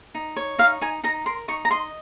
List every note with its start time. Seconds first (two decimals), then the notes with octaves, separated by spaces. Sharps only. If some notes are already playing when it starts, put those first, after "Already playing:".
0.15 D#4
0.36 C#5
0.58 D#4 F5
0.81 D#4 G#5
1.03 D#4 A#5
1.26 A#4 C6
1.48 D#4 C#6
1.65 A#5
1.71 D#5 C6